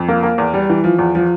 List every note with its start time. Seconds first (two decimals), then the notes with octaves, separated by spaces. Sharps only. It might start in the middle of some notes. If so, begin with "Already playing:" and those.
Already playing: F2
0.08 A#3
0.23 A#3
0.38 E2
0.54 G3
0.70 E3
0.84 F3
0.99 E2
1.15 F3